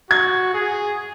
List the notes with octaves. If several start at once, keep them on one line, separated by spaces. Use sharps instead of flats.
F#4 G#6
G#4